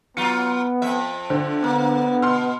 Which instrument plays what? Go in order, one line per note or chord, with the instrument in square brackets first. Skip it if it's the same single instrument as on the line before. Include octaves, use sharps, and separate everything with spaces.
[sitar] F#3 F4 [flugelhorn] B3 [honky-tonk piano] C#7
[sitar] F2 E5
[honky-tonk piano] D3 C5
[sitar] A#3 [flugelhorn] B3
[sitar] B2 [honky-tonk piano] C6 F6